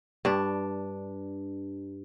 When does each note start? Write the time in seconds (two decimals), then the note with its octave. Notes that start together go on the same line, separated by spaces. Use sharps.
0.25 G2 D4